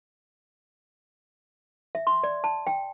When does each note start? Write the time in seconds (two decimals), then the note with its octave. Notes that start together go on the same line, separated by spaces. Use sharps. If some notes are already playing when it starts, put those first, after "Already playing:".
1.95 E5
2.07 C6
2.24 D5
2.44 A5
2.67 G5